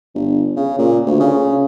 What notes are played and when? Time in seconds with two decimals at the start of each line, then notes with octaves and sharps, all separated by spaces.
0.15 G1
0.56 C#3
0.78 A#2
1.06 D2
1.20 C#3